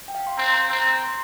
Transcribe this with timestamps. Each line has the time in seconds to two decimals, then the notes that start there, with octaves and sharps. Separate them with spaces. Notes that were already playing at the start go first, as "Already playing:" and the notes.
0.08 G5
0.15 F5
0.27 C6
0.37 C4 A#5
0.53 A#5
0.69 C4 A#5
0.86 A#5
1.03 C6